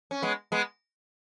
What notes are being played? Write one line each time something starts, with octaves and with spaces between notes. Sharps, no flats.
C#4
G#3 B3
G#3 B3